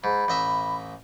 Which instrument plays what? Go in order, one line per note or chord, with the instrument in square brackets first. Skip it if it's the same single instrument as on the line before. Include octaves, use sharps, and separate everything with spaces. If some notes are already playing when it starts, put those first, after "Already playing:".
[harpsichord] G#2 [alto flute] B5
[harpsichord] A1 D#5 E5